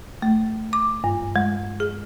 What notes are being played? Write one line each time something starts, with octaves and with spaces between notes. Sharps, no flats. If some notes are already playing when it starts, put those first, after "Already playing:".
A3
D6
G2
G#3
G#4